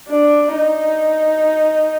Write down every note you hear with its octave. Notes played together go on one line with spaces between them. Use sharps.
D4
D#4